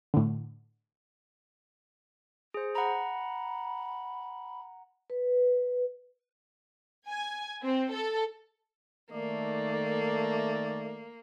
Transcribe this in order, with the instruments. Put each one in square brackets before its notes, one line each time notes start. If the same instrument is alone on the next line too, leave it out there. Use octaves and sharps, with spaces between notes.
[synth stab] A2 D3
[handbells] G#4 C5
[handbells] F#5 A#5 [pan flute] B5
[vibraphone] B4
[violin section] G#5
C4
A4
[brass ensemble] D#3 A3 D5 [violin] A#3